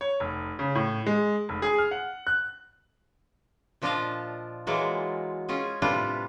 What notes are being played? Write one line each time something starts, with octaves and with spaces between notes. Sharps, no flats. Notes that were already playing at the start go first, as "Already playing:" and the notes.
C#5
F1
C#3
A2
G#3
F1
G#4
F6
F#5
F#6
A#2 F3 D4 F4 D#5 F5
E3 F#3 G#3 A#3 F4
C#4 F4 G#4
A2 C3 G3 D4 F4 B4